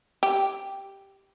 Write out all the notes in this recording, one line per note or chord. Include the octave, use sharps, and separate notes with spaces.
G4